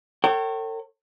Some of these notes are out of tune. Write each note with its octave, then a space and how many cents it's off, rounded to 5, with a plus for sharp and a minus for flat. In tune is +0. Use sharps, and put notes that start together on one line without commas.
A4 +45 C#5 -25 G5 -30